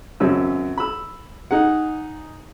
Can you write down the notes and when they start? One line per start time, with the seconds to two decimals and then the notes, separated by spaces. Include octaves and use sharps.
0.20 G#1 F#2 C#3 C#4 E6
0.78 B5 E6
1.51 D#4 G#4 F#5